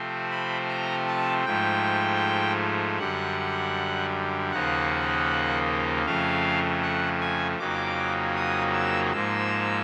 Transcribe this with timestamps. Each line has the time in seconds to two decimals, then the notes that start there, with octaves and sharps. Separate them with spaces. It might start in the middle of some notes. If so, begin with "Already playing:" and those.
Already playing: C3 F3 A3 C4
0.31 B5
0.69 A#5
1.07 A5
1.45 G#2 F3 A3 G5
2.99 F#2 D3 G3 F#5
4.52 D#2 C#3 F3 A#3 D#4 F#5
6.05 F2 C#3 F3 A3 F5
6.82 F#5
7.21 G#5
7.59 F2 C#3 F#3 A#3 D#4 D6
8.36 D#6
8.74 E6
9.12 G#2 F3 A#3 E6